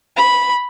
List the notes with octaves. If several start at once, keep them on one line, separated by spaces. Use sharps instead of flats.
B5